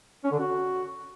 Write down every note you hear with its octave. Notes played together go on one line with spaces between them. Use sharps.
C#4
D3
F#4